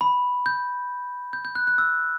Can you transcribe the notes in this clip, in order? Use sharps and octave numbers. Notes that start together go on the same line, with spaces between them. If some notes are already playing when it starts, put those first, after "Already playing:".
B5
G6
G6
G6
F#6
F#6
E6